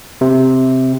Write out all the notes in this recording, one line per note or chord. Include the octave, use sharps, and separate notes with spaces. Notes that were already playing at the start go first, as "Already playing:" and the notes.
C3